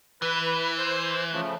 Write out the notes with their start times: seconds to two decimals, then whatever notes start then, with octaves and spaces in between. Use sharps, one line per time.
0.22 E3 B4
0.78 C5
1.33 C#3 F3 A3